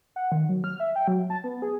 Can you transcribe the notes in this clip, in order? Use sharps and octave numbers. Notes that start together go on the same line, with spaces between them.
F#5
D#3
F#3
F6
E5
G5
F#3
A5
B3
G#4